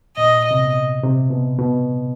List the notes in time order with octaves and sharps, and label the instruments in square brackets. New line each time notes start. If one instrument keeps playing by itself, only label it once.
[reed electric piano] A#2 [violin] D#5
[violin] D#5
[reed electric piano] C3
B2
C3
B2
B2